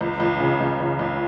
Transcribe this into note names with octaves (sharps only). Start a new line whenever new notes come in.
C#2
C#2
C#3
C#2
C#2
C#2